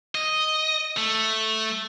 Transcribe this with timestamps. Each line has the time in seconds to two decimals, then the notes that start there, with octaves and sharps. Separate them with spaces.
0.15 D#5
0.97 A3